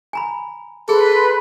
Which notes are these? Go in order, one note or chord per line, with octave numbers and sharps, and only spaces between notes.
G#5 A#5 B5
G#4 A4 B4 B5 C6